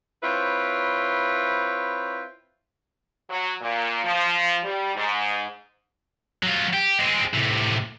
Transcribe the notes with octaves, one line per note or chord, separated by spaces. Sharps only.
C4 E4 F4 B4 C#5
F#3
A#2
F3
G3
G#2
F#3 F4
G4
G#3 C4
A2 C3